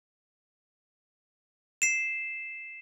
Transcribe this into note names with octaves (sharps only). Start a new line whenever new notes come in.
C7 E7